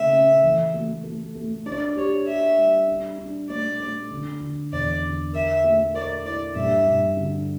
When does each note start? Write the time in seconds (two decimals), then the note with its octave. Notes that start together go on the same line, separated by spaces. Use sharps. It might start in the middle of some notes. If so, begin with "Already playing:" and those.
Already playing: C#3 A3 E5
0.13 C#4
0.43 E3
0.74 A3
1.04 A3
1.35 A3
1.66 D4 D5
1.96 G4 C#5
2.27 G4 E5
2.58 G3
2.88 D4
3.18 D4
3.49 A3 D5
3.80 A3
4.11 D3
4.41 D3
4.72 E2 D5
5.03 D3
5.33 A#4 E5
5.64 A3
5.94 A#4 D5
6.25 E4 D5
6.55 G2 E5
6.87 G2
7.17 D3